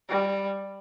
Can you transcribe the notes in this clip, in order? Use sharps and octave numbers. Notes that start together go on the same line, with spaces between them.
G3